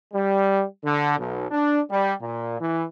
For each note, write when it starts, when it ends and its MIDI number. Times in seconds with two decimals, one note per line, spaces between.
0.14 0.64 55
0.84 1.16 50
1.17 1.46 35
1.51 1.80 62
1.90 2.13 55
2.21 2.56 46
2.60 2.83 52